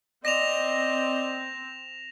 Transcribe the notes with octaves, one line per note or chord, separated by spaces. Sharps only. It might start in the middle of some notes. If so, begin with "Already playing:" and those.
C4 D5 D#5 A#6 E7 F7